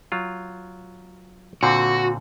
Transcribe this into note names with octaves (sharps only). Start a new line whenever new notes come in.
F#3 F4
A#2 D3 C4 F#4